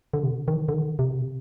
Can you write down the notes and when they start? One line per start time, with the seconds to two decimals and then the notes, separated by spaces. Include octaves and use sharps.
0.14 D3
0.23 C3
0.48 D#3
0.68 D3
0.74 D#3
0.99 C3